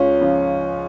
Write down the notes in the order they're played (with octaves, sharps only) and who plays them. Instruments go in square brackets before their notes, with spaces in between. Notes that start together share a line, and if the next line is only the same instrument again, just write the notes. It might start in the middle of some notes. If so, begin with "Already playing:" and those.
Already playing: [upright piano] C#2 C#4 F4
C#3 F3